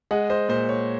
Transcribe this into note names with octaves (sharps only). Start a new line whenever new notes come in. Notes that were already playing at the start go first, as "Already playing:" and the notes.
G#3 D#5 F#5
C5 D#5
A#2 C5
C#5